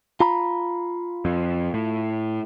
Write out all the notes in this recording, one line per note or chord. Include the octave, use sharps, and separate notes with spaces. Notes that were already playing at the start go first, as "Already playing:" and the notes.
F4 A#5 B5
F2
A2